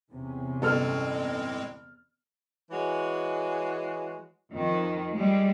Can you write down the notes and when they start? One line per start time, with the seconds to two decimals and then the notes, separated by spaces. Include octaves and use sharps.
0.10 E2 C3 C#4
0.62 G1 A2 G#3 C4 A4 F6
2.71 E3 G#3 F#4 C#5
4.54 F2 D#3
5.16 G3 G#3